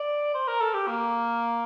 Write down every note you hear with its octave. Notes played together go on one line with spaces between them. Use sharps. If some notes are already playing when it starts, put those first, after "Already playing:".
Already playing: D5
C5
A#4
A4
G4
A#3